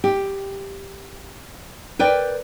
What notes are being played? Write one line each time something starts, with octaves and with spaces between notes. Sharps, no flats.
G4
A#4 B4 D5 G5